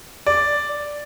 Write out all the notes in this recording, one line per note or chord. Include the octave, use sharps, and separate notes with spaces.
D5